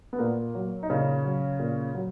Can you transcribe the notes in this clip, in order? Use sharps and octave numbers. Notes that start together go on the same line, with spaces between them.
B3
A#2 A#3
F#3
D#4
A#2 C#3 C#4
F#3
A#2
F#3